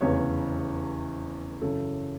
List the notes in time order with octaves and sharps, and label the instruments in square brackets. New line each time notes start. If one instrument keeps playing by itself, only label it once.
[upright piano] F1 E2 C#3 C#5
F#2 C#3 E3 A4